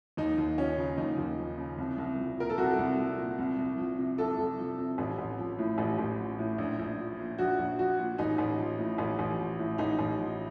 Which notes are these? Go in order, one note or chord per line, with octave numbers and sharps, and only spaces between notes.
D#2 D#4
D#2
F3 C#4
C#3
D#2 D#4
D#2
F3
C#3
C2
C2
F3
A#2 A#4
A4
C2 F#4
C2
F3
A#2
C2
C2
F3
C3
C2 A4
C2
F3
C3
A1
A1
F3
A2
A1
A1
F3
A2
A#1
A#1
F3
A#2
A#1 F#4
A#1
F3 F#4
A#2
A1 D#4
A1
F3
A2
A1
A1
F3
A2
A1 D#4
A1
F3